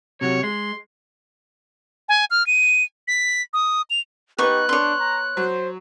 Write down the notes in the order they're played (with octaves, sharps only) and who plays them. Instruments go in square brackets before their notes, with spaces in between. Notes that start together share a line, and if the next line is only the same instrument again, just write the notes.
[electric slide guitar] C3 F#3 [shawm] C#5
[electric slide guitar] G#3 [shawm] C6
[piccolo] G#5
F6
D#7
B6
D#6
F7
[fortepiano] B3 B4 [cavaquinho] D#4 C#6 [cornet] G4 [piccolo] F#6
[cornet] D4 [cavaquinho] C#5 C6
[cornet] A#5
[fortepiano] F#3 [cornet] C5